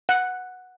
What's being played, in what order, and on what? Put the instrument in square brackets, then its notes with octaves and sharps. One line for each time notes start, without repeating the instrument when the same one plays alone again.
[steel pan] F#5